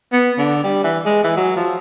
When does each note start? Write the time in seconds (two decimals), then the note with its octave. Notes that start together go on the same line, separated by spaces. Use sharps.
0.13 B3
0.39 D3
0.64 G3
0.84 E3
1.06 G#3
1.24 E3
1.37 F#3
1.56 F3